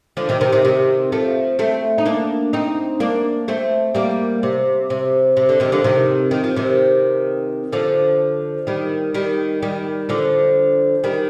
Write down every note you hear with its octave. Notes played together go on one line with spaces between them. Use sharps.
D3 F3
C3 D#3
C3 D#3
C3 D#3
C3 D#3
F3 A3
A3 C4
D#4
A#3 D4
C4 D#4
A#3 D4
A3 C4
G3 A#3
C3
C3
C3
D3
C3 D#3
D3 F3
C3 D#3
D#3
F3
C3 D#3
D3 F3
D#3 G3
D#3 G3
D#3 G3
D3 F3
D#3 G3